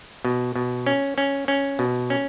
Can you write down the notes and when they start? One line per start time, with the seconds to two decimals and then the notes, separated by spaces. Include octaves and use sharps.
0.25 B2
0.55 B2
0.86 C#4
1.18 C#4
1.48 C#4
1.79 B2
2.10 C#4